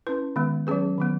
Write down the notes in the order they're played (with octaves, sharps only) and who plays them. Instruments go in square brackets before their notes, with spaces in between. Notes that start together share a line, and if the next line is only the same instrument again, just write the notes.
[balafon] C#4 E4 B4
D#3 G#3 B3
F#3 C#4 G#4 B4
D#3 F#3 B3